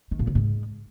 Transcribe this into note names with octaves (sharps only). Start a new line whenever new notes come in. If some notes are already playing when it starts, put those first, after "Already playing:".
D#3
A#2
C#3
G#2